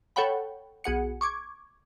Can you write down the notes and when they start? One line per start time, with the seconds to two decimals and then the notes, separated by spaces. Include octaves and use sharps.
0.16 A4 C#5 F#5 G5 B5
0.84 B1 G#4 F#5 C#7
1.21 C#6 D6 G#6